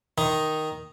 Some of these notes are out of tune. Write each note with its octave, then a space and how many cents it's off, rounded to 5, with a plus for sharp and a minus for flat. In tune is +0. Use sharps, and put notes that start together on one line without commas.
D#3 +0 D#4 +0